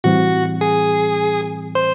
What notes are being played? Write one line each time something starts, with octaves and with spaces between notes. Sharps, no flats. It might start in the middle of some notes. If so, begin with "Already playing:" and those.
A2 E3 G3 C4 F#4
G#4
C5